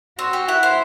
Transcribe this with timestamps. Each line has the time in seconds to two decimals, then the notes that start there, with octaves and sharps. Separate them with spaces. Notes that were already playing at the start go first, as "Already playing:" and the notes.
0.18 C4 F#4
0.33 G4
0.48 E4 F#5
0.63 C5